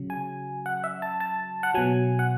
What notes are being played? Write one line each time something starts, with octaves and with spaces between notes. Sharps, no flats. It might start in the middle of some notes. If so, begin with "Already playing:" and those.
Already playing: C#3 F#3
G#5
F#5
E5
A5
A5
F#5
B2 F#3 G#5
F#5